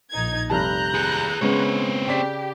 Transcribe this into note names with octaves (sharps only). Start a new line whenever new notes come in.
A#1 D#4 G#6
F1 G3 A5 A#5 F#6 G6
G#4 B4
C#3 G#3 B3 C4 C#5
C#3 G4 D5 B6